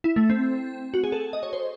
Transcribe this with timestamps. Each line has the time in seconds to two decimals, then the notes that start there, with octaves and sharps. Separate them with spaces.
0.04 E4
0.16 A3
0.30 C4
0.94 F#4
1.04 G#4
1.12 A4
1.33 D#5
1.43 C#5
1.53 C5